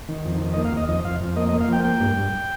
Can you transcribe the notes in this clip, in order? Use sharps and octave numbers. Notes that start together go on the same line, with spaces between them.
D#3
F2
D#3
A#3 D#5
F5
D#2 D#5
F2 D#5
F2 F5
F2
A#3 D#5
D#5
A#3
F5
F3 G5
A#3 G5
G2
G2